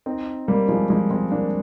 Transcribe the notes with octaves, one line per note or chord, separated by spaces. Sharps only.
C4 D#4
G3 A#3
F3 G#3
F3 G#3
G#3 C4
A#3 D4